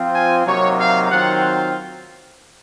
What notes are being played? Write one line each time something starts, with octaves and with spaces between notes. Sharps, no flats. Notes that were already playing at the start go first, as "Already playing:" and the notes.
Already playing: F3 C4 F4
G#5
C3 F#3 A#3 D#4 C#5
F5
D#3 F#3 C4 F4 F#5